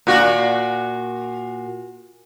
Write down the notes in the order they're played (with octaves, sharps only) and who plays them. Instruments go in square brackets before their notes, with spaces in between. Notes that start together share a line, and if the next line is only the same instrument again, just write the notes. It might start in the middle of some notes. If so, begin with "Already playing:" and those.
[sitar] A#2 F#4